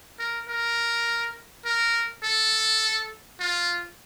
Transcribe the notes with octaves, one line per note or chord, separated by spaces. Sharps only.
A#4
A#4
A#4
A4
F4